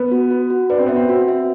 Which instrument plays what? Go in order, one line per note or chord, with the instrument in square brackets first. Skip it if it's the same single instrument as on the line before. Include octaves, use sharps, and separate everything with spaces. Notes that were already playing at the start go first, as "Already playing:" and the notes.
Already playing: [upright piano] B3 [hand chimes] B4
[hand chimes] F#4
F#4
F#4
[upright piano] D4 [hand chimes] B4
[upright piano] C4
[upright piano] B3 [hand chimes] E5
[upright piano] C4
[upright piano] C4 [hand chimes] F#4
[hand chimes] E5